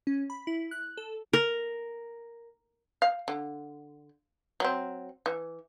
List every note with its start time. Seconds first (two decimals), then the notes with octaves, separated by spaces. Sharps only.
0.07 C#4
0.30 B5
0.47 E4
0.71 F#6
0.97 A4
1.33 A#4
3.02 F5
3.28 D3
4.60 F#3 C4
5.26 E3